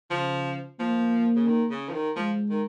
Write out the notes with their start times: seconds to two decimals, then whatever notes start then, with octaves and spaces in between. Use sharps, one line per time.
0.10 C#3 F3
0.79 F3 A#3
1.36 C#3
1.47 D#3
1.70 C#3
1.89 F3
1.93 D#3
2.16 F3 G#3
2.50 D#3